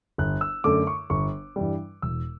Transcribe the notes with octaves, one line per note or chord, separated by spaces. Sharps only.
G1 F#6
E6
F#2 D3 A3 D6
C#6
G1 C#6
G2 E3 G3
E1 E6